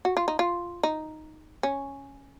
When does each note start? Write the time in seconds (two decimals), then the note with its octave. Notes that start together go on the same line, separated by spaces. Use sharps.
0.05 F#4
0.17 F4
0.28 D#4
0.39 F4
0.83 D#4
1.63 C#4